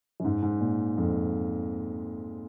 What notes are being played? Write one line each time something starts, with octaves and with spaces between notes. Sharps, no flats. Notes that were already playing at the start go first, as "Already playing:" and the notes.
F#2
G#2
G#2
A#2
F2